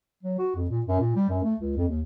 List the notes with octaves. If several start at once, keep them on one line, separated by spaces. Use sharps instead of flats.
F#3
F#4
F2
A#2
F#2
A#2
G3
F#2
A3
C#2
F2
D#2